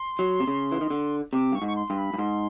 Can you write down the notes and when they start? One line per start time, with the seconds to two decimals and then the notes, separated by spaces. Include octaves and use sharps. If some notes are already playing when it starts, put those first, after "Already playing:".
Already playing: C6
0.19 F#3
0.40 C3
0.47 C#3
0.71 E3
0.81 D#3
0.90 D3
1.33 C3 D6
1.52 G2 C#6
1.62 G#2
1.67 C#6
1.75 C6
1.90 G2
1.97 B5
2.14 G2
2.18 G#2 C6